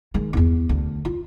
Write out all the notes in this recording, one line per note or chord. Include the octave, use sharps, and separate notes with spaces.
D#3 G#3
D#1 E2
D2
F4